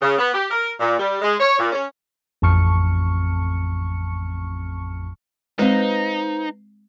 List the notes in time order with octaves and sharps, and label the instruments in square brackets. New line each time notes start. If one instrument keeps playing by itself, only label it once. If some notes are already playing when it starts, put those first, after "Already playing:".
[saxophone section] C#3
B3
G4
A#4
A#2
G3
G#3
C#5
A#2
C#4
[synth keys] A1 F2 A5 C#6 F6 C#7
[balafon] G#3 C4 [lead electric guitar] D#4 [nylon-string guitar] B4 C5 F5